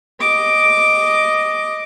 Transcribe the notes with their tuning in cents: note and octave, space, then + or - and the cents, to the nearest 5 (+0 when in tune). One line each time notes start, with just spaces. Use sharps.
D#5 +0 D6 +0